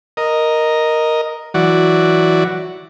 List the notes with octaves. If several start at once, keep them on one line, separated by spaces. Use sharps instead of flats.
A#4 D#5
E3 F#3 F#4 D5